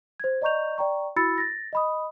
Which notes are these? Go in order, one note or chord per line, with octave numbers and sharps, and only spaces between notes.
C5 G#6
D5 D#5 A#5 C#6 G6 F7
D5 G5 A#5 C#6
E4 F#4 B5 E6 A6 C#7
A6 A#6
D#5 B5 D#6